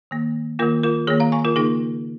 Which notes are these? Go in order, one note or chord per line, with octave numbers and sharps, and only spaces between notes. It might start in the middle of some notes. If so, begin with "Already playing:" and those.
D#3 A#3
D#3 A#3 F4 A#4
F4 A#4
D#3 A#3 G#4 C#5
F5 A#5
G#5 C#6
F4 A#4
C#3 A#3 D#4 G#4